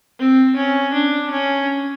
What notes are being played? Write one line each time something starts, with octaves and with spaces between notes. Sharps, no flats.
C4
C#4
D4
C#4